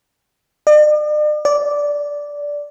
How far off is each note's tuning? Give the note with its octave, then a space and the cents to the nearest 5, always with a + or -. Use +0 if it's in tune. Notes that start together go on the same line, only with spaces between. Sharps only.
D5 +45
D5 -10